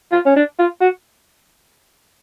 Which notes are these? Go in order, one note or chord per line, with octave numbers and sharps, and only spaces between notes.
F4
C#4
D4
F4
F#4